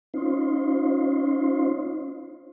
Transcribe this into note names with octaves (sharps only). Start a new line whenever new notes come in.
C#4 D#4 F4 C5